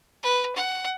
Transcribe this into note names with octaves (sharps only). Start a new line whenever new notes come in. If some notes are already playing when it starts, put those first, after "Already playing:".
B4
F#5